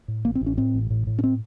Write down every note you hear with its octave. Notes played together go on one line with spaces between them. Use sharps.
A2
A1 A#3
C4
A1
C#4
A2 C4
A1
A2
A2
C#4
C4